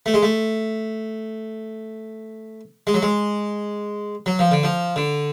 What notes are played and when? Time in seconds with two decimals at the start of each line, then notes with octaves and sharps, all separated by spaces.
0.06 A3
0.14 G#3
0.23 A3
2.87 G#3
2.94 F#3
3.02 G#3
4.26 F#3
4.39 F3
4.51 D3
4.63 F3
4.96 D3